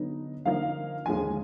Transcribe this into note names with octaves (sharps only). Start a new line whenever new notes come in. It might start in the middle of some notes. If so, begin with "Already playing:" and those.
Already playing: D3 F#3 B3 D#4
D3 F3 A#3 D#4 F5
D#2 D3 F3 G#3 D#4 G#5